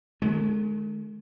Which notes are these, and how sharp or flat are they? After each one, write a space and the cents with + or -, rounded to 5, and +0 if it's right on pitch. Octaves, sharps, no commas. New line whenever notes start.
D#3 -35 G#3 +35